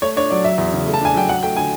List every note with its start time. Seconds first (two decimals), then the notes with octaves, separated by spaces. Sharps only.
0.02 A3 C#5
0.16 D4 C#5
0.30 F#3 D5
0.44 F#3 E5
0.58 E2
0.73 C#3
0.87 A3
0.94 A5
1.01 D4 G#5
1.14 F#3 G5
1.29 F#3 F#5
1.43 A3 G5
1.56 D3 G#5